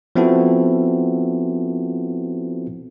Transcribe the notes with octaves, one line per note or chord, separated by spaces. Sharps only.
F3 B3 C4 E4 F#4 A4